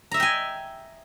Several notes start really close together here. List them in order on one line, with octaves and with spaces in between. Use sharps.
A#5 E5 D#5 G5 G#5